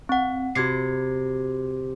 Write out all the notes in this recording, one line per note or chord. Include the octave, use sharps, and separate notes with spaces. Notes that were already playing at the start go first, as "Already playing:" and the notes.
C4 F#5
C3 F#4 G#6 C7